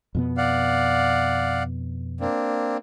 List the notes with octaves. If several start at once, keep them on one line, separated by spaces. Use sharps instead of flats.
F2 B2 B3
D5 F5 F#5
A#3 C4 D4